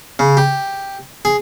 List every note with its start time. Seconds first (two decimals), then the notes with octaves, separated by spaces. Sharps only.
0.19 C#3
0.37 G4
1.25 G#4